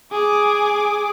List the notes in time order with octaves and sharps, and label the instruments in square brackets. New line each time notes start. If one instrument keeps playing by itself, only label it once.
[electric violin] G#4 D6